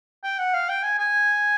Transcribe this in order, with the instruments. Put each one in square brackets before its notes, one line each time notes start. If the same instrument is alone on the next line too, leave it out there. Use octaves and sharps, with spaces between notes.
[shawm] G5
F#5
F5
G5
G#5
G#5